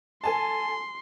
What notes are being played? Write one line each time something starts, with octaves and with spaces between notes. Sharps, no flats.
A4 G#5 A5 C6